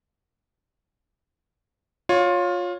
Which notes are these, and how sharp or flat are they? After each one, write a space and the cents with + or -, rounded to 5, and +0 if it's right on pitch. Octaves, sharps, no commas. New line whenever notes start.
F4 +20 C#5 +0